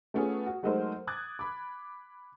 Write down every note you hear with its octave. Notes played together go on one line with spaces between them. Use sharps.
A3 B3 C#4 F4 G#4
F#4
F#3 G#3 A3 D#4 A#4 C5
D6 D#6 F#6 G#6 A6
B5 D6